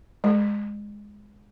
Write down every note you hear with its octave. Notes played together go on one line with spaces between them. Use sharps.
G#3